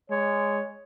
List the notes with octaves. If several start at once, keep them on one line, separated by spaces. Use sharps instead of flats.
G#3 C#5